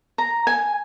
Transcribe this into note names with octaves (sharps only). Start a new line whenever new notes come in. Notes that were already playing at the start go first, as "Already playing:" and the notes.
A#5
G#5